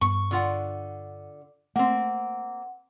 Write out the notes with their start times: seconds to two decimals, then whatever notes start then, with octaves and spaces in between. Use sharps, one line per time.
0.01 G2 B3 C#6
0.31 D3 F4 F#5
1.76 A3 A#3 C4 F#5